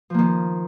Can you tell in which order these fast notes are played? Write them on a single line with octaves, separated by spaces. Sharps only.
F3 A#3 D#3